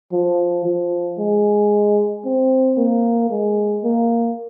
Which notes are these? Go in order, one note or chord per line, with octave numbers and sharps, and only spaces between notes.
F3
F3
G#3
C4
A#3
G#3
A#3